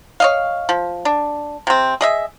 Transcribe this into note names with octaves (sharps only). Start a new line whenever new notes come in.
C#5 D#5 F5
F3
D4
C3 C4
G#4 D#5 E5